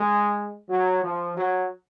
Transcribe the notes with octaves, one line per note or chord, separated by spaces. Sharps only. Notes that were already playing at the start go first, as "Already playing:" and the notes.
Already playing: G#3
F#3
F3
F#3